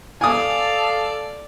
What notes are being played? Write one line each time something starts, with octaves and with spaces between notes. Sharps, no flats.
A4 D5 F5 G#5 D#6